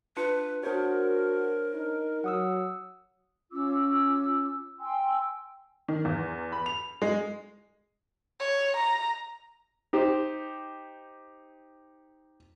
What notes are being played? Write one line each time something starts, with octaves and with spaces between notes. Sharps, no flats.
D4 F4 B4 C#7
D4 F#4 A#4 C5 C#5
D#4
F#3 F#5 D#6 E6
C#4 F4 D6 E6
G5 G#5 C6 E6
D#3
E2
B5
F7
G#3
C#5
A#5
D#4 G4 C5